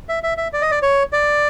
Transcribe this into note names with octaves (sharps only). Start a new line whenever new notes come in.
E5
E5
E5
D5
D#5
D5
C#5
D5